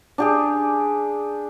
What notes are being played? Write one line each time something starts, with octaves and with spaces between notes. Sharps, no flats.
D4 G4 G#4